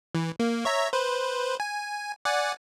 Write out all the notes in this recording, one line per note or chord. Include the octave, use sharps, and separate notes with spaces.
E3
A#3
C#5 E5 A#5
B4 C5
G#5
D5 F#5 G#5